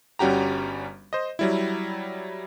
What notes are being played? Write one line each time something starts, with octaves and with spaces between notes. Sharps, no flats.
G1 G3 C#4 F#4 G4 A#5
C5 D#5
F#3 G3 E4